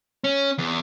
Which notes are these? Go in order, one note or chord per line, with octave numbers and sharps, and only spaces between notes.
C#4
E2